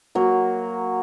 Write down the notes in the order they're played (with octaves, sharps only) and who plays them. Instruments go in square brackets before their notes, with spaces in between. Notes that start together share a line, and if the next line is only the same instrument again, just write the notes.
[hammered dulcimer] F#3 A#3